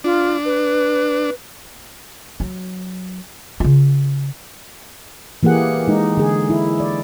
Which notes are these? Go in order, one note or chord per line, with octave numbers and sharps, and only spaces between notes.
D4 F4
B4
F#3
C#3 F4
E3 A#3 G4 G#4 F#5
G#3 D#4
D3 G#4
E4
D5